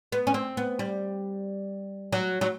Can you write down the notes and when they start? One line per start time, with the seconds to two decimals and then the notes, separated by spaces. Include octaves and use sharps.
0.12 B3
0.27 C#4
0.34 C4
0.57 B3
0.79 G3
2.12 F#3
2.41 F#3